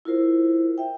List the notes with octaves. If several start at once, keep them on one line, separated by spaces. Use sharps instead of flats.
E4 F4 A#4 C5
E5 G5